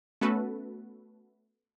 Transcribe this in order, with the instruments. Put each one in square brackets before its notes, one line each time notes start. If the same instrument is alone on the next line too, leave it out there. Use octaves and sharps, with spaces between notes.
[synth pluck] A3 B3 C#4 F#4 A4 B4